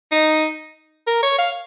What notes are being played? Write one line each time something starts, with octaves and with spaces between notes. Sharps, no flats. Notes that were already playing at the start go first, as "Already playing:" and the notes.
D#4
A#4
C#5
F5